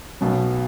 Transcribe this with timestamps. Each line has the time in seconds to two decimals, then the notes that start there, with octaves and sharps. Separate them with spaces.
0.21 B1 B2 F#3